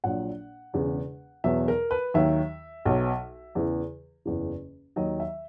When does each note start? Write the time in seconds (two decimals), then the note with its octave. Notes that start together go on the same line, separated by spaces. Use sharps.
0.04 A#1 A#2 F#3 F#5
0.73 E1 E2 C#3
1.44 E2 B2 F#3 E5
1.68 A#4
1.91 B4
2.14 D#2 D#3 F#3 E5
2.85 B1 B2 F#3
3.55 E2 C#3 E3
4.25 F#1 E2 C#3 E3
4.96 D#2 D#3 F#3 D#5
5.20 E5